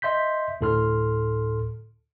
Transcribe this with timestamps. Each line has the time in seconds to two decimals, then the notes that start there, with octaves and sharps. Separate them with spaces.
0.02 D#5 E5 C6 G6 B6
0.61 D2 A2 A4 C6 F6